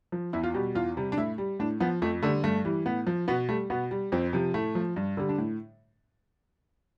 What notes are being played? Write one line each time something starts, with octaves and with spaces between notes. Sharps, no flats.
F3
E2 E4
F4
B2 G3 G4
E2 F4
C3 G3
D4
A2 E4
G3
A2 D4
F3 B3
F2 A3
D3 G3 A3
G2 A3
E3 G3
A2 B3
F3
B2 B3
G3 A3
B2 B3
G3
F2 C4
C3 F3
A2 A3
F3
G2
D3 G3
D4
A2